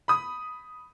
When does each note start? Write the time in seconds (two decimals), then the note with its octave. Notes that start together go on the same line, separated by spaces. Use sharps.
0.08 B5 D#6